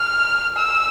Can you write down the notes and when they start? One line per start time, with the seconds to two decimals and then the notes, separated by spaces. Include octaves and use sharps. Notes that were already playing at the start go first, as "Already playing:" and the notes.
Already playing: F6
0.56 E6